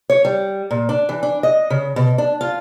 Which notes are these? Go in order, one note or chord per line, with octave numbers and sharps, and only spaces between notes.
C#5
G3
A#2
D4
E3
D4
D#5
C#3
B2
D4
F4